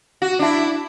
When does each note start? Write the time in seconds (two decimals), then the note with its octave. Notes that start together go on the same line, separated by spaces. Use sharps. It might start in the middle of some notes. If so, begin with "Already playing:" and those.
0.22 F#4
0.39 D4 E4